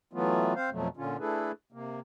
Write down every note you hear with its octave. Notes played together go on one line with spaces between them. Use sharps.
E3 F#3 A3 B3 F4
C4 C5 F5
F2 B2 F3 F#3 A3
A#2 D3 C#4 F4
A3 D4 E4 G#4 A4 B4
C3 A#3